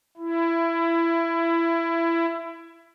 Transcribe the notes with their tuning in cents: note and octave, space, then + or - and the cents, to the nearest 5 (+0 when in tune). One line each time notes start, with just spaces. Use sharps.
E4 +20